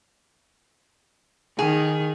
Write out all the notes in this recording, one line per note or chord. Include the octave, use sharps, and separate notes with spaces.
D#3 G#4